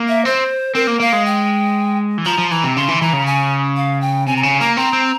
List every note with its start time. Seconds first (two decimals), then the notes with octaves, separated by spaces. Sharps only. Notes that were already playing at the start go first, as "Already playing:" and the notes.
Already playing: A#3
0.08 E5
0.25 C4 C5
0.75 C4 A#4
0.87 A#3
1.00 A#3 F5
1.13 G#3
1.26 G5
2.18 E3
2.26 F3 A#5
2.38 F3
2.51 E3 A#5
2.64 C3
2.76 C#3 C6
2.89 E3
3.01 E3 A#5
3.13 C#3
3.26 G#5
3.76 F5
4.01 G5
4.26 C3 G#5
4.37 A#5
4.43 C#3 G#5
4.60 A#3 A#5
4.77 C4 A#5
4.93 C4